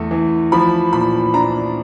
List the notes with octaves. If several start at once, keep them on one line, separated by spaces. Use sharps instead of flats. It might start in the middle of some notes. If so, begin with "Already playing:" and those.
Already playing: E2 A3
E3
F3 B5
A#2 B5
D4 A#5